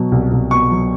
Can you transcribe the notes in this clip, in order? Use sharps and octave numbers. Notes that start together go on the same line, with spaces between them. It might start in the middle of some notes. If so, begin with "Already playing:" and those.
Already playing: B2 F#3
C2
C2
B2 C#6
F#3